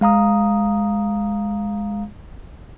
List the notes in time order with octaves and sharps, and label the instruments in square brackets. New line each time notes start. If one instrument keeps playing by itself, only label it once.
[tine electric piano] G#3 F5 A#5 D#6